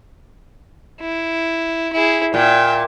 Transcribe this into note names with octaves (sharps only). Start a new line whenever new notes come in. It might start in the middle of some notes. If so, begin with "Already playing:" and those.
E4
E4 G#4
A#2 E5 G5